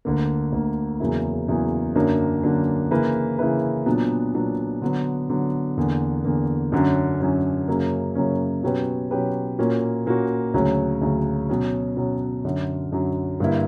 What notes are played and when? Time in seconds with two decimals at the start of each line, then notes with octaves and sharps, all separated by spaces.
0.05 D2 D3 A#3
0.52 D2 D3 A#3
1.00 E2 C#3 F#3 A#3 E4
1.48 E2 C#3 F#3 A#3 E4
1.96 F#2 D3 F#3 A#3 D4
2.43 F#2 D3 F#3 A#3 D4
2.91 C#3 E3 A#3 E4 B4
3.39 C#3 E3 A#3 E4 B4
3.86 A#2 F#3 B3 D4
4.34 A#2 F#3 B3 D4
4.82 D3 F#3 B3
5.30 D3 F#3 B3
5.77 E2 D3 A#3
6.24 E2 D3 A#3
6.72 F#2 D3 F#3 C#4
7.20 F#2 D3 F#3 C#4
7.68 F#2 C#3 F#3 A#3 C#4
8.15 F#2 C#3 F#3 A#3 C#4
8.63 B2 F#3 C#4 G4 B4
9.11 B2 F#3 C#4 G4 B4
9.59 A#2 A#3 C#4 F#4
10.06 A#2 A#3 C#4 F#4
10.54 D2 C#3 F#3 C#4
11.02 D2 C#3 F#3 C#4
11.49 B2 F#3 C#4
11.97 B2 F#3 C#4
12.45 F#2 D3 F#3
12.92 F#2 D3 F#3
13.40 G2 D3 A#3 E4